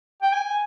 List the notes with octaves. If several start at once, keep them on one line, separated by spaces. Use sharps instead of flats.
G5
G#5